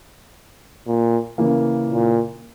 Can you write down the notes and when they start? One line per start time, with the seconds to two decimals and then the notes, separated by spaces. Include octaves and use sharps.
0.87 A#2
1.38 C#3 E3 A#3
1.89 A#2